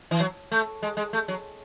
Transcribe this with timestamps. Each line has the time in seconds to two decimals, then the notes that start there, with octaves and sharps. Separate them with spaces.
0.11 E3
0.20 F#3
0.51 A3
0.82 G#3
0.97 G#3
1.13 A3
1.28 F#3